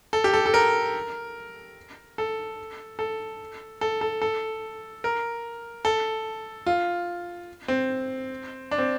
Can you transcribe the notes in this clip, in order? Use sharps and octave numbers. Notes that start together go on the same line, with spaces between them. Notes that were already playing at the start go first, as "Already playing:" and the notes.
A4
G4
A4
A4
A#4
A4
A4
A4
A4
A4
A#4
A4
F4
C4
D4
C4